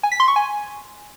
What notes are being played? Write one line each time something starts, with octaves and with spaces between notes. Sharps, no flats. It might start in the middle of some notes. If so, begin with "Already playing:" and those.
G#5
B6
C6
C#6
G#5